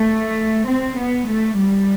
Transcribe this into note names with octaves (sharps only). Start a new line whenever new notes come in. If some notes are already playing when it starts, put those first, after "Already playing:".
Already playing: A3
C4
B3
A3
G3